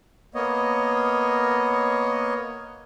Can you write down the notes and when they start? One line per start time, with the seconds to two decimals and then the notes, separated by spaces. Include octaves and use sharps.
0.35 A#3 B3 C#5 D#5